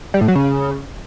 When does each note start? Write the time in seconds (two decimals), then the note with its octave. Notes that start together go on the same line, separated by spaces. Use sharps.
0.14 G3
0.21 A2
0.28 F#3
0.35 C#3